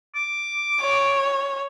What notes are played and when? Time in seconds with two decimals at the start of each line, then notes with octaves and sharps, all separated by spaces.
0.15 D6
0.81 C#5